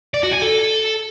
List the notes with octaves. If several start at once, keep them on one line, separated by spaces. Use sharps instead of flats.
D5
F#4
G#5
A4